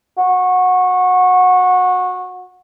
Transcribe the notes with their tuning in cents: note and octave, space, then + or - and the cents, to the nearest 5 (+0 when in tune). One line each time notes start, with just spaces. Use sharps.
F#4 -20